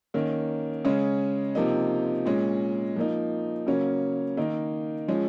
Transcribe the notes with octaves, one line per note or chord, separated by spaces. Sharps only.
D#3 A#3 C#4
C#3 G#3 C#4
C3 F3 A#3 D#4
A#2 G#3 C#4
F3 A#3 D#4
C#3 F#3 A#3 C#4
D#3 A#3 D#4
F3 G#3 C#4